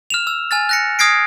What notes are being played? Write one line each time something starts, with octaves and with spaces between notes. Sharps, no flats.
F6 E7 F7
E6
G#5 F6 A6
F#6 A#6 C#7
D#6 F6 G#6 A#6 C7 D7